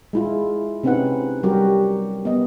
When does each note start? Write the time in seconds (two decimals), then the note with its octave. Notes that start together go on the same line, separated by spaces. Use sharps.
0.13 G#3 E4 F4
0.83 C3 C4 C#4 D#4 B4 F#5
1.43 F#3 G3 F#4 G4 A#4
2.25 B3 D#5